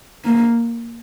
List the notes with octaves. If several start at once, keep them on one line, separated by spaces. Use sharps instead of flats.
A#3